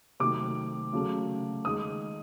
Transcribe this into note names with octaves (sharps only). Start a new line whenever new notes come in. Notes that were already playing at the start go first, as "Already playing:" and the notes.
C3 D#3 F#3 A3 D6
C#3 F#3 A3
D#3 G#3 D#6